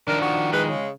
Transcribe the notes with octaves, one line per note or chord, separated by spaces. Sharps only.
D#3 F3 D4 A#4
F#4
G#3 B4
C#3